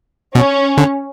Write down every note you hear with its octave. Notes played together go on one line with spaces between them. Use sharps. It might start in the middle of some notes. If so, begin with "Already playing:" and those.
B2 C#4
D3